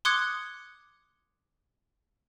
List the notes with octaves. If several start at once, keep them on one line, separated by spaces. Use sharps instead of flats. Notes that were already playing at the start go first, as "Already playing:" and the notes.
C6 D6 D#6 F#6 G#6 C#7